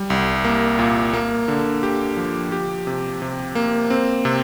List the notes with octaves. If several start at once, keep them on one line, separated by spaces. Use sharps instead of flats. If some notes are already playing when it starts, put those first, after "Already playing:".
Already playing: G3
C2
A#3
A#2
A#3
D3
G4
F3
G4
C3
C3
A#3
C4
C3